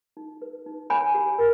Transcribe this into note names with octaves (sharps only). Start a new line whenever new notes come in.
D#4
B4
D#4
C#5 G#5 B5
G4
A#4